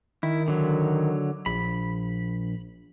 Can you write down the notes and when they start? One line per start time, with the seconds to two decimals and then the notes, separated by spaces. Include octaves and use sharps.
0.23 D#3 E4
0.48 D3 F#3
1.46 A#1 B5